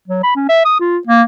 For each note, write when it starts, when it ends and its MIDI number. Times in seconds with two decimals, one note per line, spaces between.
0.08 0.23 54
0.23 0.33 83
0.36 0.47 61
0.49 0.63 76
0.66 0.76 87
0.80 0.98 65
1.07 1.22 58